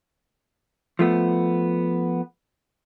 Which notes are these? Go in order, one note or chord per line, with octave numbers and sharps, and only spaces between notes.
F3 A3 B3